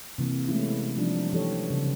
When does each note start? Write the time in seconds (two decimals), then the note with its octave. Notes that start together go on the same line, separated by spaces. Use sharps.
0.18 C3 E3 A#3
0.48 E3 G#3 A3 B3 C#4 E4
0.97 E3 F3 G3 D4 D#4
1.33 E3 G4 A4 C#5
1.70 C#3